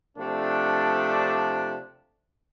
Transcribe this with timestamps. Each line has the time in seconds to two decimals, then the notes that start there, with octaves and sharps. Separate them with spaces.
0.17 C3 F3 A3 D4